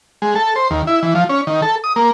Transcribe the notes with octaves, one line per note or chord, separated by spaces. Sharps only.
G#3
A4
C5
D#2
E4
E3
F3
C#4
D#3
A4
D#6
A#3